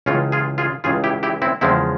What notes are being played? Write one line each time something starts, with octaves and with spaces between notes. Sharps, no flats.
C#2 C#3 E3 C#4 F4
F4 G#4
F4 G#4
C#2 C#3 E3 F4 G#4
E4 G4
E4 G4
C4 E4
E2 C#3 F3 G#3 C4 E4